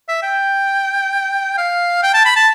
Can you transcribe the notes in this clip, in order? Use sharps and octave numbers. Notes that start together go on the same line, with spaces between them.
E5
G5
F5
G5
A5
B5
A5